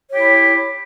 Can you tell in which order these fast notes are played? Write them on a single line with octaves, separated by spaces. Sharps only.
C#5 G4 E4